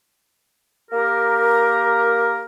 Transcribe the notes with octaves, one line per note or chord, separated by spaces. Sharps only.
A#3 G4 A#4